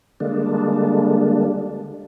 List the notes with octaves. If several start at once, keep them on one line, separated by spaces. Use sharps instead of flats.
D3 G3 G#3 A#3 D4